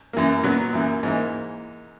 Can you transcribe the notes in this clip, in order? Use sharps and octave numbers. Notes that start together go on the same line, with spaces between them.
F#2 E3 A#3
A#2 F#3 B3
F#2 E3 A#3
G#2 E3 A#3